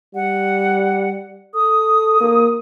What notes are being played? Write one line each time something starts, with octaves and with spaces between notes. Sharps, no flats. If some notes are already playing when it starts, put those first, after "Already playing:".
G3 F#5
A4 D#6
A#3